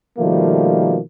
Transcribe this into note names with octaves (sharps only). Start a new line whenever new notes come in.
B2 D#3 F3 G3 A3 A#3